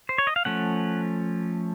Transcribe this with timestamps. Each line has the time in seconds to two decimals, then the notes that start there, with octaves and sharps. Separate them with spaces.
0.09 C5
0.18 C#5
0.27 D#5
0.36 F5
0.45 F3 A3 C#4 F#5